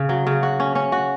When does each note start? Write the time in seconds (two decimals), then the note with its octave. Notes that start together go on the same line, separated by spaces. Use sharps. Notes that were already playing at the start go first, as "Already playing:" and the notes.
Already playing: C#3
0.09 F#3
0.27 C#3
0.43 F#4
0.60 C#4
0.75 C#4
0.92 F#4